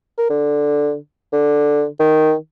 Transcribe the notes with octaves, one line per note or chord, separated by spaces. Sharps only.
A#4
D3
D3
D#3